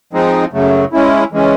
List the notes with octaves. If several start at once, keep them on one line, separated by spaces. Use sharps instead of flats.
F3 G#3 C4 D#4
F#2 C#3 F#3 A3
G#3 C#4 E4
E3 G#3 C#4